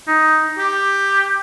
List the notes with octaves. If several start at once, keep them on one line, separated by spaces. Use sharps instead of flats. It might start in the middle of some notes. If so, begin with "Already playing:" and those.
D#4
G4